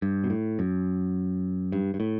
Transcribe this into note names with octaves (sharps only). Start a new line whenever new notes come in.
G2
B2
A2
F#2
G2
G2
A2